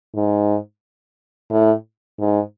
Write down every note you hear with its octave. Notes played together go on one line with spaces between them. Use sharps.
G#2
A2
G#2